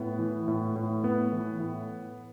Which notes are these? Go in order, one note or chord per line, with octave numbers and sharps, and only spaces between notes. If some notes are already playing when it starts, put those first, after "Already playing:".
Already playing: A2 B3
E3
A2
A2
A2 B3
E3
A2